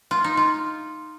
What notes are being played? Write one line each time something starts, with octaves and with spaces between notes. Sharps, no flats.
F4
D#4
F4